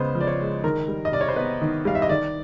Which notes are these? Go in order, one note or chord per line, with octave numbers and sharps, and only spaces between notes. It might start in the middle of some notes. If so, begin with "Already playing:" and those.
Already playing: C#3 G#3 B3 C5
F3
D5
C#5
G#3
D#3 A#4
G3
D#5
C3 D5
C#5
C5
B3 B4
D#3
G3 F5
E5
D#5
D#3 D5